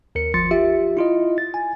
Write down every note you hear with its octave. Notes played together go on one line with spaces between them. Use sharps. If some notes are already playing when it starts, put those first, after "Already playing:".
D#2 A#4 C#7
G1 F3 C6 A6 C#7
F4 G4 E5
E4 F4 D#5
A6
G#5